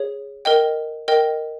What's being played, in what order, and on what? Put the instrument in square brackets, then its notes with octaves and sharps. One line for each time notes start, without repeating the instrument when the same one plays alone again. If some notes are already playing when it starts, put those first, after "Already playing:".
Already playing: [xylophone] G#4 C#5
A#4 D#5 G5
A#4 D#5 G5